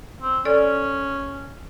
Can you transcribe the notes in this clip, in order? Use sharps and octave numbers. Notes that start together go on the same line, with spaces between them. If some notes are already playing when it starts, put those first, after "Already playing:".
C4
C#4 A4 D5